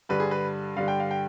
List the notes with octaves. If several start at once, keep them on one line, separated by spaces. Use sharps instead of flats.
G2 D3 G3 B4
G#4
B4
G2 D3 G3 F5
G5
F5
G5